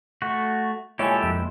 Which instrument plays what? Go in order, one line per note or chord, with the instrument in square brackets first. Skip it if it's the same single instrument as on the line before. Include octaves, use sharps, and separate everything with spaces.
[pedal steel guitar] A3 F#4
[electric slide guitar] A#2 G#3 E4 [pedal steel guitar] G4 A4 [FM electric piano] C#5 G#5
[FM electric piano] F2 E5